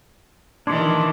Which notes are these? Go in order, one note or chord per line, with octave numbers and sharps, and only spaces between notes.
D#3 E3 D4 C6 D6 G#6